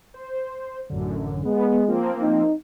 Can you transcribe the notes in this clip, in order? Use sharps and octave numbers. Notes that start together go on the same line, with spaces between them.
C5
A1 F#2 D3
G#3 B3
F3 A#3 C4
D#4